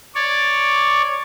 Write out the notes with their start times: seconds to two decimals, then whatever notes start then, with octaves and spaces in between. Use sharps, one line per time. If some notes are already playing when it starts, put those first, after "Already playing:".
0.15 C#5 D5